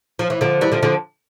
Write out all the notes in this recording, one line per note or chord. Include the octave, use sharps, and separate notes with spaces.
F3
E3
D3 F3
E3 G3
D3 F3
D3 F3